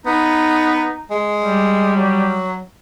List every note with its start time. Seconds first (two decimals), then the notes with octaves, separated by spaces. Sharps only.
0.06 B3 D#4
1.11 G#3
1.42 G3
1.96 F#3